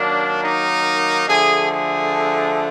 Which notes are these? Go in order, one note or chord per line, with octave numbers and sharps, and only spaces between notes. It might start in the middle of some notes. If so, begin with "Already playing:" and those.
Already playing: D#3 F#3 A#3 D4
D#4
D3 F3 A3 G#4
G#4